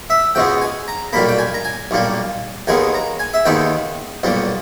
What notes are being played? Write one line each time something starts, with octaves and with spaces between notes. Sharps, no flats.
E5
C#2 B2 G#3 B3 G5
G#5
A#5
B1 A#2 G3 A#3 B5
G5
G#5
A#5
G#5
B1 A#2 G3 A#3
D#2 D#3 G#3 B3 G#5
A#5
G#5
E5
D#2 D#3 G#3 B3 G5
B1 A#2 G3 B3